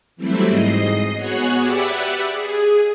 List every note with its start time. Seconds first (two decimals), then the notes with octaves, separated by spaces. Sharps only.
0.16 E3 F#3 G3 A3 C4 E4
0.47 G#2 D#5 C7
1.16 B3 F#4 G#4 C#5 F#5
1.58 G4 B4 D5 E5 F#5
2.27 G#4